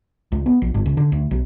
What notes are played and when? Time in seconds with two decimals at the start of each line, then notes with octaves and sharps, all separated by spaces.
0.32 C#2
0.46 B3
0.62 A#1
0.74 G1
0.86 C#2
0.97 D3
1.12 D2
1.31 B1